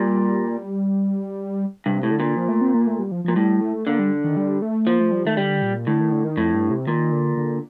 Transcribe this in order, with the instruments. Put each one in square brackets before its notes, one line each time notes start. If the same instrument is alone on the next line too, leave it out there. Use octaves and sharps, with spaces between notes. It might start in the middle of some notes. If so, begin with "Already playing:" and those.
Already playing: [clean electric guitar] A#2 [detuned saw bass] G3
[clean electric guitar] G2 [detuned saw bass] C3
[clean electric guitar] A2
[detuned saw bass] D3
[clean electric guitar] A#2
[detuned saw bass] F3
A3
C4
A#3
A3
G3
F3
[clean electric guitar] A#2 [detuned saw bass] F3
[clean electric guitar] A2 [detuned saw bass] G3
[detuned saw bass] A3
[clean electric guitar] D3 [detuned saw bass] A#3
[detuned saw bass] G3
D#3
G3
A3
[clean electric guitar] F3 [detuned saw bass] A#3
[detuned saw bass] A3
G3
[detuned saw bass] D#3 [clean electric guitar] A3
[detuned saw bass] D3 [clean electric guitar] G3
[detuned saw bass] A#2
[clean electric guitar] A2 [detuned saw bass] D3
[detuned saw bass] D#3
D3
D#3
[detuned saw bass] F2 [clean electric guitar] A2
[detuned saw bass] G2
C3
[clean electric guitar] A#2 [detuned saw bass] D#3
[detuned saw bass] D3
D3